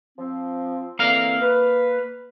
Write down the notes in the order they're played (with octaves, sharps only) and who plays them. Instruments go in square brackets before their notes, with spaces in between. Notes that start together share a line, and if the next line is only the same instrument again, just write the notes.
[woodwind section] F3 C4
[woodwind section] D3 E3 C4 [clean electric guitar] A#3 F5
[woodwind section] B4